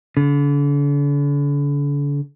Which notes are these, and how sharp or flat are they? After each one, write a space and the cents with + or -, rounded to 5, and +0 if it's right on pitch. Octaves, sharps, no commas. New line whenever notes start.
D3 -40